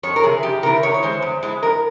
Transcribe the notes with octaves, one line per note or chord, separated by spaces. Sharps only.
F2 C#5
A#4
C3 E3 G#4
F2 G4
C3 E3 A#4
E2 C#5
C#5
E3 G#3 C5
E2
E3 G#3
F2 A#4